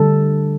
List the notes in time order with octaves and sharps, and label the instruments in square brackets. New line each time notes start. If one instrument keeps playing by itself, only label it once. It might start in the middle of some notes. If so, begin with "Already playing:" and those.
Already playing: [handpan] D3 G3 A4